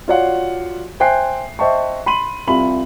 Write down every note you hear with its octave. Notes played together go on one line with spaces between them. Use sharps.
F4 F#4 C#5 D5 F5 F#5
C5 E5 G5 G#5 F#6 C7
C5 D#5 E5 G5 A5 C#6
B5 C6 D#7 F#7
C2 C3 F4 B5 F#7